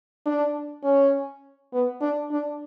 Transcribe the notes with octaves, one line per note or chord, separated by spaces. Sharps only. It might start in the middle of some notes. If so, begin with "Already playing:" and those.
D4
C#4
B3
D4
D4